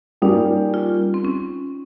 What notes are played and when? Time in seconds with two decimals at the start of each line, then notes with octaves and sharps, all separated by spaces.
0.22 G3 A#3 C#4 D#4 G4
0.74 F4
1.14 C4
1.25 C#4